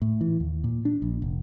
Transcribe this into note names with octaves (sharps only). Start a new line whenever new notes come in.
A2
E3
D#2
A#2
D4
A#1
F1